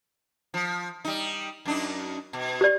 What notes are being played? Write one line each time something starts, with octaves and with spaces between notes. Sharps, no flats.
F3
G3 D#4
F#2 D4 D#4
B2
G4 D5